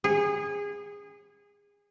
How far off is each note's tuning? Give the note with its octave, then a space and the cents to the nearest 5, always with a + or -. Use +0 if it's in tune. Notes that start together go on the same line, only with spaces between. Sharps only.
G#4 -25